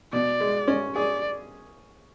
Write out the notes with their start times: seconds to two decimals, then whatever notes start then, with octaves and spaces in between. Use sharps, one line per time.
0.12 B2 D5
0.40 G#3
0.68 C#4
0.95 G#4 D5